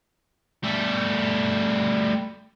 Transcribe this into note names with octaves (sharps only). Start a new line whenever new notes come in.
G3 A3